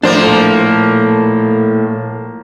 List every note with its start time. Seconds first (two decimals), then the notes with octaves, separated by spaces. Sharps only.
0.04 A2 F3 A#3 D4 C5
0.23 A#2 A4